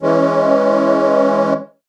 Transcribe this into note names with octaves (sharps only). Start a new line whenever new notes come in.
E3 G#3 C#4